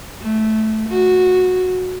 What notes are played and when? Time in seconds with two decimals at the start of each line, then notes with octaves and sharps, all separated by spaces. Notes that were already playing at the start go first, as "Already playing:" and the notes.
0.22 A3
0.89 F#4